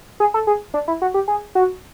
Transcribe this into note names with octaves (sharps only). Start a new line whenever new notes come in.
G#4
A4
G#4
D4
E4
F#4
G4
G#4
F#4